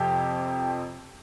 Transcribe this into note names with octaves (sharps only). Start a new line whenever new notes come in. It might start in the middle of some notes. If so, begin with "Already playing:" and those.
Already playing: F2 C3 F3 G4